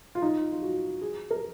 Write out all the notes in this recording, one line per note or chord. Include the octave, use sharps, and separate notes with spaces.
F4
D#4
F4
F#4
G#4
A#4